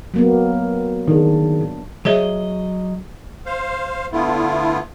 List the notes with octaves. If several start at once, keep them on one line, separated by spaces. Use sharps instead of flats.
F#3 A#3 B3
D#3 D4 G#4
F#3 G#4 C#5 D#5 E5
C5 F5
D3 A3 B3 E4 F4